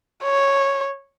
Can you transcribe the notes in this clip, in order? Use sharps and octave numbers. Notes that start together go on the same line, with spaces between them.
C#5